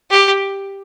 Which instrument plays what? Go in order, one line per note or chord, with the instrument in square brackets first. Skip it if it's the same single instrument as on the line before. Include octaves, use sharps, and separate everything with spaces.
[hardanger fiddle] G4